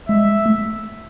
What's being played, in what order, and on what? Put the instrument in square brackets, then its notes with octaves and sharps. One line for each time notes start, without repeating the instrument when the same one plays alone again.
[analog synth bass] G#3 [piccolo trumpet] E5
[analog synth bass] A3